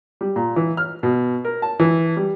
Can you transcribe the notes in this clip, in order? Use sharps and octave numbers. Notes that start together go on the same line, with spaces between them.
G3
A#2
E3
F6
B2
A#4
A5
E3
G3